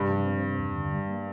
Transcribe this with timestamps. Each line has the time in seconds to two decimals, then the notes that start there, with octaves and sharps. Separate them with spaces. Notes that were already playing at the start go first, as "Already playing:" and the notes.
Already playing: G2 C3
0.10 F3
0.26 C4
0.42 C3
0.59 E2
0.75 D3
0.92 G3
1.08 A#3